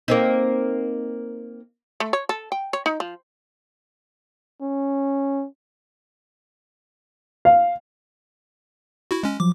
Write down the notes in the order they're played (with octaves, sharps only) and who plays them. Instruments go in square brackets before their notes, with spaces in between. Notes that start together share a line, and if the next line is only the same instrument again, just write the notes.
[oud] A#3 C4 D#4
[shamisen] A3
C#5
A4
G5
C#5
D#4
F3
[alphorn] C#4
[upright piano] F5
[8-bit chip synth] E4 F#4
G#3 C#4
[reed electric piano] F3 F#3 [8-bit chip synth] D6